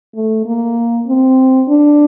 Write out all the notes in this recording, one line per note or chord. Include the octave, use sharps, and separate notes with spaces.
A3
A#3
C4
D4